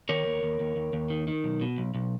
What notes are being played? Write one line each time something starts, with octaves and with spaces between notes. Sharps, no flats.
D#3 A#4 C#5
D#2
D#2
D#2
D#2
D#2
D#3
D#3
B1
B2
B1
B1